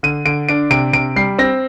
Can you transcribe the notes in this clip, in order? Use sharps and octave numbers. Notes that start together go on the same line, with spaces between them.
D3 D#7
D3 D7
D4 D7
C3 D7
C3 D7
G3 C7
C4 A#6